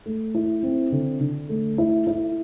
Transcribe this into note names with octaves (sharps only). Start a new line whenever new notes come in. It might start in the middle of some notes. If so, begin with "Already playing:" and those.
A3
E4
C4
D3
D3
A3
E4
E4